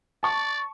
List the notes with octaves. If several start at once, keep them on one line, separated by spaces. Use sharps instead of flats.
D5 A5 C#6